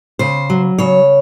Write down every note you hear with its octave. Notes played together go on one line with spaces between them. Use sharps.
C#3 C5
F#3
C#3 C#5